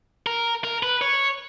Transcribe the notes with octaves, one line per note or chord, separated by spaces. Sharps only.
A#4
A#4
B4
C#5